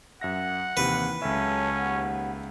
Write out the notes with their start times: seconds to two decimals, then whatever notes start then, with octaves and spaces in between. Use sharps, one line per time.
0.21 F#2 E5 F#5 A#6
0.77 D#2 C3 E3 B4
1.22 C#2 F#3 C#4 A4 E5
1.73 D#2 B3